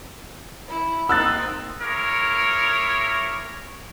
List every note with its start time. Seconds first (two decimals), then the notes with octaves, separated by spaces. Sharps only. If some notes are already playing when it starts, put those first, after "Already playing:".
0.67 E4
1.09 A#3 C4 D#4 E6 F#6 A6
1.81 E4 G#4 A#4 C#5 D6